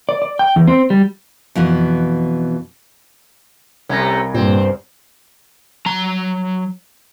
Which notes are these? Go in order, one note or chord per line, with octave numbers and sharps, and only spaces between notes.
D5
D5
G5
E2
C4
G3
F2 B2 E3 B3
C2 C3 A3 C#4 G#6 A#6
G2 A#2 C4
F#3 A#5